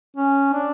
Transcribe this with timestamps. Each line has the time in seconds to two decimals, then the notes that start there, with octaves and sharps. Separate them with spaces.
0.16 C#4
0.53 D4